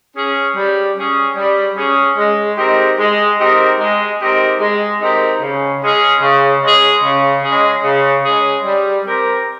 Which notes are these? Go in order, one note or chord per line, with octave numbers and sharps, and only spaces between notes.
C#4 G#4
G3
C#4 G#4
G3
C#4 G#4
G#3
C4 D#4 G4 A#4
G#3
C4 D#4 G4 A#4
G#3
C4 D#4 G4 A#4
G#3
C4 D#4 G4 A#4
C#3
G#3 C#4 G#4
C#3
G#3 C#4 G#4
C#3
G#3 C#4 G#4
C#3
G#3 C#4 G#4
G3
C4 G4 A#4